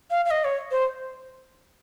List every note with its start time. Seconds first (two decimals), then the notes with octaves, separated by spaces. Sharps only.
0.11 F5
0.25 F5
0.31 D#5
0.44 C#5
0.71 C5